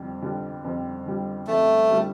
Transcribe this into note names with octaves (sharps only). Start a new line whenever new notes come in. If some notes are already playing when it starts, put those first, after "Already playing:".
Already playing: F2 D3 G3
D3 G3
F2
D3 G3
F2 A3
D3 G3